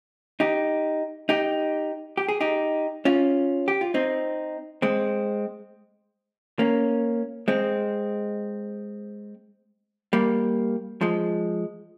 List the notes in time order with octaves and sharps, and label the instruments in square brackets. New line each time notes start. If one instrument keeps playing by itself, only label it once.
[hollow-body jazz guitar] D#4 G4
D#4 G4
G4
G#4
D#4 G4
C#4 F4
G4
F4
C4 D#4
G#3 C4
A#3 C#4
G#3 C4
G3 A#3
F3 G#3